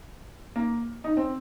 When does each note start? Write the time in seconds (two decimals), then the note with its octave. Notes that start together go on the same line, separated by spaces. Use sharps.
0.56 A#3
1.04 D#4
1.17 C4